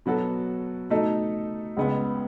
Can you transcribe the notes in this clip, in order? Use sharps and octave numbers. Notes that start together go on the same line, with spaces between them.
B2 F#3 B3 F#4 A4
B2 A3 D#4 A4
C#2 C#3 G#3 B3